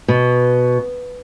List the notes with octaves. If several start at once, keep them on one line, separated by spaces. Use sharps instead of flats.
B2